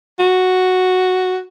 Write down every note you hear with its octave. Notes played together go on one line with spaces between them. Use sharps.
F#4